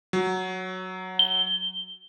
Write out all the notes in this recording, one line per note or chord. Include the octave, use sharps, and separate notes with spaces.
F#3
G7